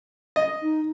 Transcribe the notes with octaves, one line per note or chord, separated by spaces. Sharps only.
D#5
D#4